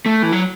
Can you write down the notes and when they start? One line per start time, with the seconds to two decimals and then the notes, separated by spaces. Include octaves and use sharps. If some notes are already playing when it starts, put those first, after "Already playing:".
0.06 A3
0.23 E3
0.32 F#3